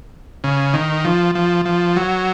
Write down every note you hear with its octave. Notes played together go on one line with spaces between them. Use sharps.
C#3
D#3
F3
F3
F3
F#3